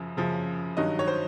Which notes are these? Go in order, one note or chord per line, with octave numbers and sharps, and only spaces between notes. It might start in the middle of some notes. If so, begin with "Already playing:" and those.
Already playing: F#2 C#3 F3
F#2 C#3 F3
G2 D#3 F#3 D#5
C#5
C5